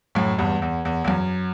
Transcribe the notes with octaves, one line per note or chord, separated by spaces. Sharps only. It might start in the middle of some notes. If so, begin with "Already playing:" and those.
F#2 A2
E2 G2
E2
E2
E2
F#2